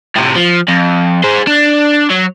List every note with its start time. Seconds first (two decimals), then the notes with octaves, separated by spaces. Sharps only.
0.16 A2 C3
0.36 F3
0.69 F2
1.24 G#4 C5
1.47 D4
2.11 F#3